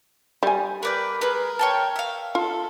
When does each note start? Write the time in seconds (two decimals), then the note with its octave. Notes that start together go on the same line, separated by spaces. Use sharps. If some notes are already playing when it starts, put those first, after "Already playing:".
0.43 G3 G#5
0.83 A#4 B4 D5 G6
1.21 G#4 A#4 B4
1.59 C#5 G5 A5
1.96 E5 F5
2.35 F4 A4